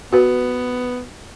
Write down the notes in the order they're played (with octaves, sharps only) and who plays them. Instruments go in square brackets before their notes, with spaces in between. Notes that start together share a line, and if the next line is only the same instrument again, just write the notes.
[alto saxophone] B3 [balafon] F#4 B4